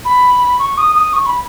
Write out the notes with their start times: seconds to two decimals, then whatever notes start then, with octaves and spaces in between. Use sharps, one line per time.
0.05 B5
0.59 C#6
0.77 D#6
0.95 D#6
1.13 C#6
1.26 B5